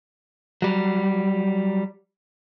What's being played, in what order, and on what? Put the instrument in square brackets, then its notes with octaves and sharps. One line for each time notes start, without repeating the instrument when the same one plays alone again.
[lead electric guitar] F#3 G3